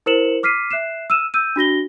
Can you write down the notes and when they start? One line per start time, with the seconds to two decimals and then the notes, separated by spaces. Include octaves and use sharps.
0.06 E4 A#4 C5 C#7 E7 F#7
0.43 D6 F6 B6 C7 D#7
0.71 E5 F#6 C7 E7
1.10 E6 F6 D#7 E7
1.34 E6 G6 D#7
1.56 D4 F#4 A#6 G7